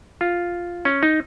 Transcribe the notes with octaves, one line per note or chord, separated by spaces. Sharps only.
F4
C#4
D#4